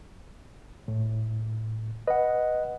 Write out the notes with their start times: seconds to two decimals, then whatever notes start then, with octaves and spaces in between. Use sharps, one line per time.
0.88 A2
2.07 B4 D#5 F#5